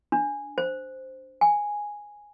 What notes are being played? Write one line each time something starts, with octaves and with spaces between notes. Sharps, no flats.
D4
C5
G#5